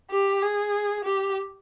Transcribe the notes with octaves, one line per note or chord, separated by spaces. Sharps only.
G4
G#4
G4